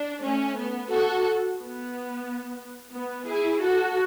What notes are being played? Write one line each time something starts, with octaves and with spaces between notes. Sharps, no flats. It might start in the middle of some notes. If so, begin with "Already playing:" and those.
Already playing: D4
A3 C#4
B3
F#4 A4
B3
B3
E4 G#4
F#4 A4